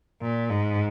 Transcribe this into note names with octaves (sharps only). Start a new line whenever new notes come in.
A#2
G#2